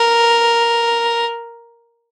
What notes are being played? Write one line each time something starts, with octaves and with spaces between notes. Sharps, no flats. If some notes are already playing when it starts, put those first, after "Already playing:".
Already playing: A#4